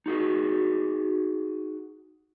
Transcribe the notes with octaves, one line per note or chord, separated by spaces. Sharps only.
D#4 F#4 G#4